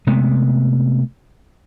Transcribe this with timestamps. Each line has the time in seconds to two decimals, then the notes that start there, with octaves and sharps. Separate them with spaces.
0.07 C3 G#3 A3 B3